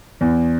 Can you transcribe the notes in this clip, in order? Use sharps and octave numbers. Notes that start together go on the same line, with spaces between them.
E2